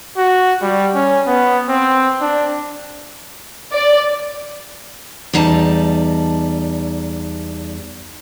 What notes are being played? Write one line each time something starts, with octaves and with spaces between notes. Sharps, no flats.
F#4
G3
C#4
B3
C4
D4
D5
E2 G3 D#4 A5